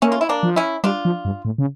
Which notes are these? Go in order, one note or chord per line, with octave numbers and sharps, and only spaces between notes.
A3 A#3 C#4
F4
E4
A#3 D4
F3
C#4 E4
G3 D4 F4
F3
G2
A2
C#3